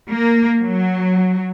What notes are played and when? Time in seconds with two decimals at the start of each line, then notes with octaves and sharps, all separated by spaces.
0.11 A#3
0.62 F#3